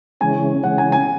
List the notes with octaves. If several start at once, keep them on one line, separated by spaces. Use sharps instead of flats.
C#3 E3 G#3 C#4 G#5
C#3 E3 G#3 C#4 F#5
G#5
G#5